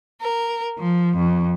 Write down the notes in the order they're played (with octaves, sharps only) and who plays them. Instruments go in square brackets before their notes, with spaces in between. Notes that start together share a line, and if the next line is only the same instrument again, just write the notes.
[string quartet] A#4
F3
F2